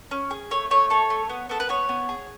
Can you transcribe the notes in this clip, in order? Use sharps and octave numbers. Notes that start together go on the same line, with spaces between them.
C#4
G#4
A3 C#5
A3 C#5
A4 C#5
A3
B3
B3 A4
B4
B3 C#5
B3
G#4